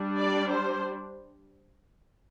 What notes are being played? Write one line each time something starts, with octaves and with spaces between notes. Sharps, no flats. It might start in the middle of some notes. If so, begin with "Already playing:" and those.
Already playing: G3 D4
D5
C5